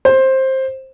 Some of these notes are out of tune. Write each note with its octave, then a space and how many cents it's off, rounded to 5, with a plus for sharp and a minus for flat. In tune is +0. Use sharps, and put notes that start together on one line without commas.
C5 +15